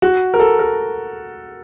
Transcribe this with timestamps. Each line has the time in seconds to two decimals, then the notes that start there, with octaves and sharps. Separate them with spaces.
0.02 F#4
0.34 A#4
0.40 A4
0.59 A#4